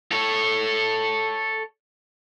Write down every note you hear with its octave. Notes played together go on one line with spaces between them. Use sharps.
A4 C#5